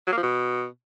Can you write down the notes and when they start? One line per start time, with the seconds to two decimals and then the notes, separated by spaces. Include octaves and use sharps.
0.07 F#3
0.12 A#3
0.18 F3
0.23 B2